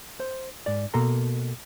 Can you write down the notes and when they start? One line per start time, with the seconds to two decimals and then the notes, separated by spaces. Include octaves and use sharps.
0.20 C5
0.66 G#2 D5
0.94 B2 A#3 A4 A#5 C6